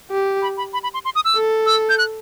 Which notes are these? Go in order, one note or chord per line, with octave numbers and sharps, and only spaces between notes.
G4
B5
B5
B5
B5
C6
C6
D#6
E6
A4
E6
G6
F#6